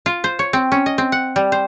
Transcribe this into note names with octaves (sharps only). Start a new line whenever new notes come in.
F4
C5
C#5
C4
C#4
D#5
C4
F#5
G3
C5